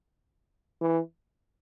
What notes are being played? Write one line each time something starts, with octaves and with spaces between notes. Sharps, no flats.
E3